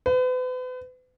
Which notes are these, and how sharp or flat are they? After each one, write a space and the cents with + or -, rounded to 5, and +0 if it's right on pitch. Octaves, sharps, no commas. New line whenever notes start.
B4 +40